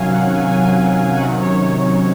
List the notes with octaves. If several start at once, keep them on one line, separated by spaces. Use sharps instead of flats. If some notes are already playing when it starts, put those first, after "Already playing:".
Already playing: C3 D#3 F#3 C#4 F5 G#5
F#5
G#5
G#5
G#5
G#5
C3 D#3 F#3 C#4 F#5
C#5